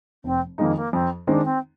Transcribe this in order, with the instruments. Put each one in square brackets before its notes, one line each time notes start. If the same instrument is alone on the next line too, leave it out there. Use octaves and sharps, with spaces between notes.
[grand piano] F1 [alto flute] C4
[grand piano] F2 D#3 G#3 D#4 [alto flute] A#3
[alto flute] A#3
[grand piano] F2 [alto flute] C4
[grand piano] D#3 G#3 C4 D#4 [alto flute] D4
[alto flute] C4